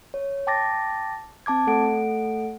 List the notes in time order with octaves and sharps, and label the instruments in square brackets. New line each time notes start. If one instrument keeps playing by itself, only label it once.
[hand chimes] C#5
G5 A5 D6 A6 A#6
C4 A5 D6 G#6
A3 A4 F#5 D7